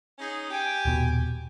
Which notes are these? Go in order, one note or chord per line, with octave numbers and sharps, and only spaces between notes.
C#4 D#4 G#4
G4 G5 G#5
D#1 B2